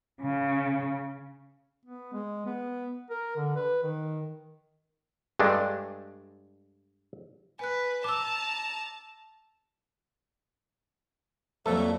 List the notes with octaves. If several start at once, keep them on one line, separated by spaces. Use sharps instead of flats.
C#3
B3
G#3
B3
A#4
D3
B4
D#3
G2 G#3 A3 D4
B4 G#5 F#6
A5 A#5 D6 E6
F2 A#2 F#3 G3 A3 A4 E5